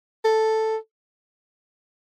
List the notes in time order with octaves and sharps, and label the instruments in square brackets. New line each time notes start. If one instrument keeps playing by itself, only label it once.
[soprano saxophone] A4